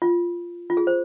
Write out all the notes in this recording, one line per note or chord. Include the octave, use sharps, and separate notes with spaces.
F4
F4
G#4
C5